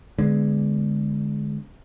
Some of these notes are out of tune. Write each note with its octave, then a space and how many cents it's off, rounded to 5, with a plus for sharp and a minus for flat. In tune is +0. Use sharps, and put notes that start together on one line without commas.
D3 +0 G#3 +0 B3 +10